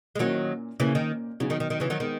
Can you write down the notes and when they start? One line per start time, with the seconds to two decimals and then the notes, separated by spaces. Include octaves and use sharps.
0.15 G#3
0.19 A#2 D#3 F#3 A#3 C#4 E4
0.80 A#2 C#3 E3 A#3 C#4
0.95 D#3
1.40 C#3 F#3 B3 D#4
1.50 D#3
1.60 D#3
1.70 D#3
1.80 C#3 E3
1.90 D#3 F#3
2.00 D#3 G#3 B3